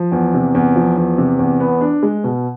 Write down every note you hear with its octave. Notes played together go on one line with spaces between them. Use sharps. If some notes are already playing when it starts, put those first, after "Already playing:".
Already playing: F3
E2
C3
E2
F3
E2
C3
E2
B3
D4
G#3
B2